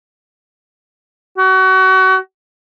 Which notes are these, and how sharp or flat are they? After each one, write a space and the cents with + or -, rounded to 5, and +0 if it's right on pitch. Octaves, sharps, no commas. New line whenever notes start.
F#4 +30